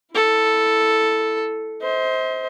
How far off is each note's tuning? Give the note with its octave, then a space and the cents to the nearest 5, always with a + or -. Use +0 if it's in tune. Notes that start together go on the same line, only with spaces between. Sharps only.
E4 +0 A4 +0
C5 +0 D#5 +45